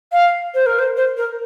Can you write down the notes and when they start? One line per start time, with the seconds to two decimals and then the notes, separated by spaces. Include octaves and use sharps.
0.12 F5
0.54 C5
0.66 A#4
0.79 C5
0.97 C5
1.17 A#4